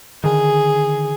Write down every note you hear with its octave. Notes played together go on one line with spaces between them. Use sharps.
D3 D#3 G#4